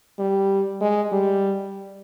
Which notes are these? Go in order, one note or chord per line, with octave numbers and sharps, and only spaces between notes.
G3
G#3
G3